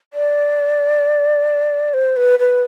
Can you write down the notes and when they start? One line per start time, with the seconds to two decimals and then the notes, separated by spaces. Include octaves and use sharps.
0.14 D5
1.94 C5
2.17 B4
2.39 B4